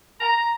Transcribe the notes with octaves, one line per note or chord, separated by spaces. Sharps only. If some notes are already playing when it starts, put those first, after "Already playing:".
A#5